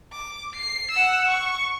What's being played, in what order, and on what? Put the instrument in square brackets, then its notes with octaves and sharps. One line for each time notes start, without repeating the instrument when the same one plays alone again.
[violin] D6
C7
F#5 E6
C#6